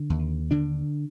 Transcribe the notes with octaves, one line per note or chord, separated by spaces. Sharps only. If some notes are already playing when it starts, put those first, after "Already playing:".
Already playing: D3
D#2
D3 D4